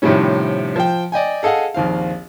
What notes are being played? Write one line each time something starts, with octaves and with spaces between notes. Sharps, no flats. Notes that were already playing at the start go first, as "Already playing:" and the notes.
A2 C3 D#3 F3 G3 C#4
F3 G5
D5 D#5 G5 G#5
G#4 A4 D#5 F5 F#5
A#1 D#2 C4 F5